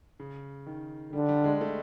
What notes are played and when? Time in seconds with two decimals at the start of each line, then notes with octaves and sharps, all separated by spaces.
0.20 C#3
0.66 D#3
1.13 D3 G3
1.29 G3
1.44 G#3
1.61 A3